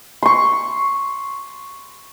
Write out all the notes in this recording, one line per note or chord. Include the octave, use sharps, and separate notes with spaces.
C6 C#6